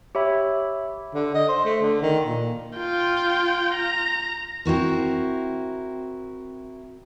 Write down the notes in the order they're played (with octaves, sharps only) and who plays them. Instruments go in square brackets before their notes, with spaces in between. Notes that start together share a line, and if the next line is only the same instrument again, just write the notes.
[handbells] G4 C#5 E5 B5
[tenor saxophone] D3
D#5
C5
A3
D3
D#3
A#2
[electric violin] F4 G5
A#5
[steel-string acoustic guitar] C4 E4 F#4 A#4